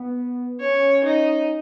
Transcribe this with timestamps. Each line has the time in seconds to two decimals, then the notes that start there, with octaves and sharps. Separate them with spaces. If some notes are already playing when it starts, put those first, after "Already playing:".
Already playing: B3
0.60 C#4 C#5
1.05 D#4